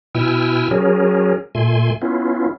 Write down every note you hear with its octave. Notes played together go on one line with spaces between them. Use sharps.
B2 E4 G5 G#5 E6 F6
F#3 C#4 G#4 A#4
A#2 A3 G#5 C6
B3 C#4 E4 F4